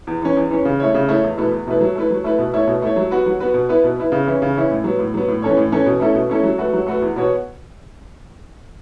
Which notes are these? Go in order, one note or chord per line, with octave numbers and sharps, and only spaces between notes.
E2
E3 C#4
E2
E3 C#4
C#3
A3 E4 C#5
C#3
A3 E4 C#5
E2
B2 A3 E4 B4
E2
B2 A3 E4 B4
F#3
A3 E4 B4
F#3
A3 E4 B4
B2
A3 E4 C#5
B2
A3 E4 C#5
F#3
B3 F#4 B4
F#3
B3 F#4 B4
B2
B3 E4 B4
B2
B3 E4 B4
C#3
E3 C#4 E4
C#3
E3 C#4 E4
A2
F#3 B3
A2
F#3 B3
A2
E3 C#4 A4 C#5
A2
E3 C#4 A4 C#5
B2
A3 C#4 E4 A4
B2
A3 C#4 E4 A4
F#3
A3 F#4 B4
F#3
A3 F#4 B4
E2
B2 B3 F#4 C#5